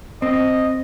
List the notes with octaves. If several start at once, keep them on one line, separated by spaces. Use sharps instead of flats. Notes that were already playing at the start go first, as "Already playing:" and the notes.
C4 D#5